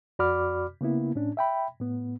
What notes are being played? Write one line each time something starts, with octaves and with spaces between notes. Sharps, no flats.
F2 F#4 D5 B5 D6 F6
C#3 A#3 B3 E4
A2 C#4 D4
E5 G5 B5
A2 B3